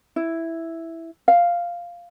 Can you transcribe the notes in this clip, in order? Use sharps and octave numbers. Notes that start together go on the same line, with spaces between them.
E4
F5